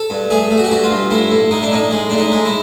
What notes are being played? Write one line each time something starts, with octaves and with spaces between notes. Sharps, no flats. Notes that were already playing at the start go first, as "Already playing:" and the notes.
Already playing: A4
G2
A3 G#4
A3
F#4
G4
G2 F#4
F4
G2
A2 E4
A2
A2 D#4
D4
A2 D#4
G#3
A2 D4
D#4
G#3
E4